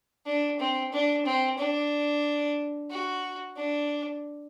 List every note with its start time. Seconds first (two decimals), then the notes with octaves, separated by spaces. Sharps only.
0.26 D4
0.60 C4
0.92 D4
1.26 C4
1.58 D4
2.90 F#4
3.57 D4